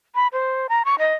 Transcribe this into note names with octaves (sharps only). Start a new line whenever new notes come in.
B5
C5
A#5
C#6
D#5